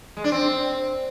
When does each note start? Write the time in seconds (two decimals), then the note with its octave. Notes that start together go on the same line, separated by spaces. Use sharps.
0.17 G#3
0.24 D4
0.32 C4